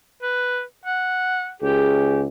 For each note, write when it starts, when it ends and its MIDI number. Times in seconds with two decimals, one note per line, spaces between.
0.22 0.62 71
0.85 1.52 78
1.62 2.27 37
1.62 2.22 67
1.62 2.25 68